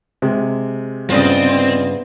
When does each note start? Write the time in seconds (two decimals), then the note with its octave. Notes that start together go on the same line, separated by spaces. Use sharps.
0.22 C3 G#3
1.10 G2 C#3 B3 C4 F4 D5 D#5